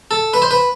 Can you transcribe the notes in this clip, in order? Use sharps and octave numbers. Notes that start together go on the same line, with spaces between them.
A4
B4
C5
B4